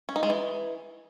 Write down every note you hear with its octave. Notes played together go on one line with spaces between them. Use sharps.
C#4
D#4
G#3
E3